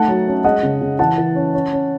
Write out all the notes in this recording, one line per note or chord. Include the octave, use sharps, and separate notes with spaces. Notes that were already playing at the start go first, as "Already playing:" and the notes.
Already playing: A3 D#4 F#5 A5
F#3
C#4
G#3 D#5 F#5
C#3
C#3
E3 F#5 A5
E3
C#4
C#4
C#4